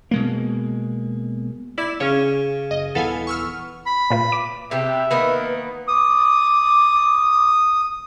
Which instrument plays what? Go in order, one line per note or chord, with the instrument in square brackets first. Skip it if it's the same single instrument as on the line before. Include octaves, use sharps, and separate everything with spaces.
[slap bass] B2 G#3 A#3
[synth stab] E4 E7 [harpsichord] D5
[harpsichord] C#3 [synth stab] C#4 C#5
[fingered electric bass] F#1 [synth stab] D#5
[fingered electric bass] D#1 E3 [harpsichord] B3 [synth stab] A4 F5 G#5
[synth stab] C#6 E6 F6
[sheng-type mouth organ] B5
[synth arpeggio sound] A#2 F4 B4
D6
[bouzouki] C3 B3 G4 [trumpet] E5
[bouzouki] D#3 A#3 B3 [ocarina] B4
[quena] D6 [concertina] D#6